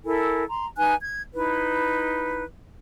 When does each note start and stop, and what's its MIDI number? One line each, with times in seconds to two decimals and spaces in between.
0.04 0.43 64
0.04 0.43 69
0.04 0.43 70
0.04 0.43 80
0.48 0.66 82
0.48 0.66 84
0.77 0.94 63
0.77 0.94 71
0.77 0.94 80
0.77 0.94 90
1.01 1.22 92
1.34 2.43 63
1.34 2.43 64
1.34 2.43 71